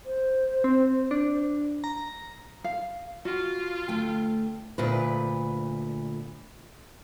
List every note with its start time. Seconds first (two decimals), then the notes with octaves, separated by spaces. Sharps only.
0.06 C5
0.64 C4
1.11 D4
1.84 A#5
2.64 F5
3.25 F4 F#4
3.88 D2 A3 G5
4.78 D2 A#2 B4